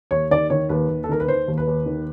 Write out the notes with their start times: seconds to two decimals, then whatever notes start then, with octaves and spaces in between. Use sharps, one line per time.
0.11 D#2 C#5
0.31 D#3 D5
0.50 D#3 C#5
0.69 D#2 B4
0.89 D#2
1.04 A4
1.09 D#3 A#4
1.20 B4
1.27 D#3 C5
1.48 D#2
1.58 B4
1.67 D#2
1.86 D#3